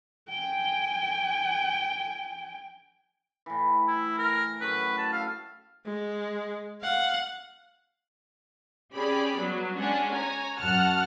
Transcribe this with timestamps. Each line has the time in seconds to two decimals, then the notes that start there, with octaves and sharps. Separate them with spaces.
0.29 G5 G#5
3.46 A2 E3
3.87 E4
4.18 A#4
4.61 F#2 A2 B4 C#6
4.98 A5
5.13 A4 F5
5.86 G#3
6.82 F5 F#5
8.95 C#4 G4 G#4 D5 B5
9.37 F#3 G3 B3
9.77 G#3 C#4 D4 F#5 G#5
10.14 C#5 G#5 A#5
10.59 F#2 F#4 F#5 A5 F6